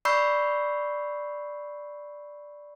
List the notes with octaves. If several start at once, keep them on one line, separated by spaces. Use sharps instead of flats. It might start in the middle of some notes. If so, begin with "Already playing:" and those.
D5 B5 C#6 E6 G6 C7